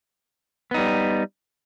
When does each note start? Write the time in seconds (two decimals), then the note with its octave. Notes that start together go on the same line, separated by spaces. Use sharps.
0.71 B3
0.74 D#4
0.78 G3